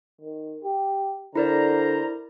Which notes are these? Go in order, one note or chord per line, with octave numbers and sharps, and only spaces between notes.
D#3
G4
D3 E4 A#4 C5 D5 A#5